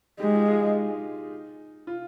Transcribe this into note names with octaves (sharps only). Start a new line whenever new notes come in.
G#3 D#4 G4
F4
F4 G#4
D#4
F4